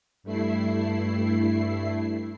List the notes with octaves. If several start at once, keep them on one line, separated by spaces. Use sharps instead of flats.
G2 A3 E4 C7